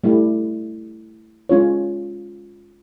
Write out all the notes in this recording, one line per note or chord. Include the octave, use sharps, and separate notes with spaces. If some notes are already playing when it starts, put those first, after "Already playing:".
G3 A3 E4
G#3 C#4 F4 C#5